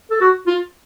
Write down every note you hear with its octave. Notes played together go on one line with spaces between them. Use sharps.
A4
F#4
F4